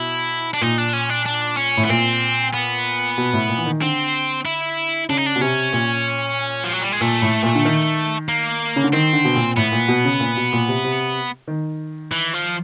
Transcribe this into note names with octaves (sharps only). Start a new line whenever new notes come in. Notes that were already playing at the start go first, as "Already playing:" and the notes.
Already playing: B2 E4
D4
A#2 D#4
D4
C#4
D4
D4
C#4
A2
B3
A#2 C4
B3
B2
A2
A#2
E3
D#3
D3 C4
E4
C#3 D4
D#4
D4
B2
C3 C#4
A#2
F3
F#3
G3
G#3
A#2 A3
A2
A#2
D3
D#3
A#3
C#3
D3
D#3 C4
D3
B2
A#2
A2 B3
A#2
B2
C#3
A#2
B2
A#2
C3
C3
D#3
E3
F3